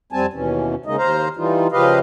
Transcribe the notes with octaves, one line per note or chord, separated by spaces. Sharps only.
F2 G3 C4 G#5 A5
D#2 B2 E3 C#4
C#3 G#3 A#3 D#4 D#5
D#2 C5 F5 A#5
E3 G3 D#4 F4
C#3 F3 G4 B4 D#5 F5